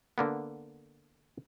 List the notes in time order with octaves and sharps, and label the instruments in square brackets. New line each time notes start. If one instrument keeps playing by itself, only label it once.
[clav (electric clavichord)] D3 A#3 B3